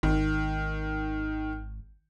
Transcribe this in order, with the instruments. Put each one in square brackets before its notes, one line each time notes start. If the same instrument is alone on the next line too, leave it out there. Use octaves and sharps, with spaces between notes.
[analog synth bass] G#1 [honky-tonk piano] D#3